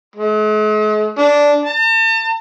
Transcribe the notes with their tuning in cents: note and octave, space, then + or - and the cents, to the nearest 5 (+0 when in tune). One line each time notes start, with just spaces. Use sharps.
G#3 +45
D4 -10
A5 +40